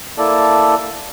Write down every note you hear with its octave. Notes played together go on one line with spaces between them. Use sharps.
A#3 E4 A4 D5 A5